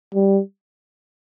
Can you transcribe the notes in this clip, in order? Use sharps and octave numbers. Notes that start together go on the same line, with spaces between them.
G3